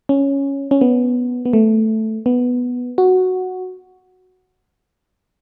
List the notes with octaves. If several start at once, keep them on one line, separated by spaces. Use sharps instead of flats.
C#4
C#4
B3
B3
A3
B3
F#4